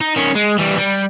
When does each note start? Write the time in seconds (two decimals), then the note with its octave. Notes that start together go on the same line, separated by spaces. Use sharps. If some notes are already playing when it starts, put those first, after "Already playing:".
0.01 D#4
0.16 D#3 C#4
0.36 G#3
0.59 E3 G3
0.78 G3